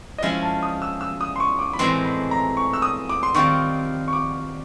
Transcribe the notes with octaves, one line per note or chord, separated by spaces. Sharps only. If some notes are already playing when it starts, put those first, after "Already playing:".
D#5
F3 G#3 C#4 E4 E5
A5
D#6
E6
E6
D#6
C6
C#6
D6
B5
A2 E3 G#3 C4 C6
B5
A#5
C#6
E6
D#6
D6
C6
D#3 G3 C4 F4 C#6
C#6
D6